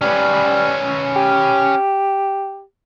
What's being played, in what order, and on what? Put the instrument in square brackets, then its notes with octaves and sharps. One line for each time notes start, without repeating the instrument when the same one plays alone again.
[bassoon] G3 [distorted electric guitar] C#4 B4
[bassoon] G4